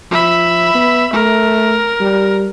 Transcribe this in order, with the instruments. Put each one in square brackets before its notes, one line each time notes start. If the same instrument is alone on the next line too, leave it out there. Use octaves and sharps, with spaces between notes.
[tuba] F3 [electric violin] E5 B5
[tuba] B3
[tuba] A3 [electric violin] A#4
[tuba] G3